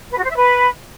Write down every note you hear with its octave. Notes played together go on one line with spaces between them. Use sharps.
B4
F#4
C5
E5
B4